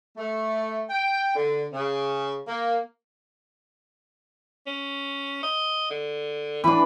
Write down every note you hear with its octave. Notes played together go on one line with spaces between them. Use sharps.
A3
G5
D3
C#3
A#3
C#4
D#5
D3
E3 D4 B4